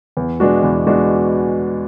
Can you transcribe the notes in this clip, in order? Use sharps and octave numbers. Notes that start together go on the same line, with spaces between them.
E2
B2 G#3 D4 F#4
E2
B2 G#3 D4 F#4